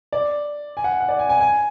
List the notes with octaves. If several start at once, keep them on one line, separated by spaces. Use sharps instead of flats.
D5
G#5
F#5
F#5
D5
G#5
G#5
G#5